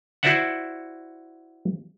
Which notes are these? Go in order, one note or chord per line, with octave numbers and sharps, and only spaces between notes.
E4 F#4 C5 D5 E5 F#5